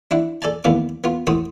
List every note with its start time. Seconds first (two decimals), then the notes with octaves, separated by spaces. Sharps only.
0.11 D4 E4 F#5
0.42 A4 D5 G#5 A5
0.64 D#2 A2 B3 F5 D6
1.04 B3 F4
1.27 A2 F#4 C5 G5 D#6